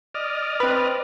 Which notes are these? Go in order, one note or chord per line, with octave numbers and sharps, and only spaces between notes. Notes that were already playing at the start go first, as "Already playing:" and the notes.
D5 D#5 F6
C4 B4